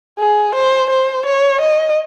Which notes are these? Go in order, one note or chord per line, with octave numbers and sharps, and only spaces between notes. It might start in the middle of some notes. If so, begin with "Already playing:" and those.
G#4
C5
C5
C#5
D#5